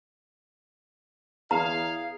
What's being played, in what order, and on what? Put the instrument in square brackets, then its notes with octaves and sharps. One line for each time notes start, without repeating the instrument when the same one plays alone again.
[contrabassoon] E2 [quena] G#4 [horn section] F5 [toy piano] A#5